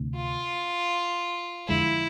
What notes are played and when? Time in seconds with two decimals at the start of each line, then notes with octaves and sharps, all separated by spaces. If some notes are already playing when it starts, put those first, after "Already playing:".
Already playing: D2 C3
0.16 F4
1.68 F2 D3 G#3 E4